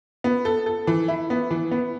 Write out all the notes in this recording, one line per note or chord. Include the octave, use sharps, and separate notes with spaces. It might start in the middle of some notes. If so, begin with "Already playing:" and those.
B3
A4
A4
E3
E4
B3
E3
B3